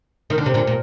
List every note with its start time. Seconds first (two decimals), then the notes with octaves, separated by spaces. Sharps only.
0.30 D#3
0.38 D3
0.46 C3
0.54 A#2 D3
0.67 A#2